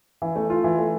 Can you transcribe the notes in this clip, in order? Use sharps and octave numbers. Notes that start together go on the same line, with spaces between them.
E3
A3
F4
E3
A3